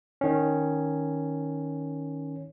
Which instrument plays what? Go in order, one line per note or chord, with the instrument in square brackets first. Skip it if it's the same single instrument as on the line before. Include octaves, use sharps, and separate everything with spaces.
[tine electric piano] D#3 C#4